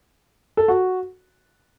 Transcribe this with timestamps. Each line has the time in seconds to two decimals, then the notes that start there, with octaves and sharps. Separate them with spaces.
0.57 A4
0.68 F#4